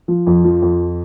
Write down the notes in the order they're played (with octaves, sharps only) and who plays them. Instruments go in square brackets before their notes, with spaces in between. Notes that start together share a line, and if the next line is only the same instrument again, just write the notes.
[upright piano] F3
F2
F3
F2